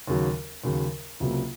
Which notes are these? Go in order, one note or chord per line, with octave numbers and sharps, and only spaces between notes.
D#2 C#3 F#3
D#2 C#3 F#3
C#2 C3 F#3 A#3